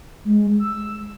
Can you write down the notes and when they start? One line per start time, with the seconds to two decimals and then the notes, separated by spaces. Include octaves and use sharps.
0.25 G#3
0.60 E6